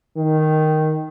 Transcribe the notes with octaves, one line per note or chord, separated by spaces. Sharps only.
D#3